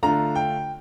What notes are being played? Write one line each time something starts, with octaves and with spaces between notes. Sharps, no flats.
D3 A3 D4 F4 A#5
G5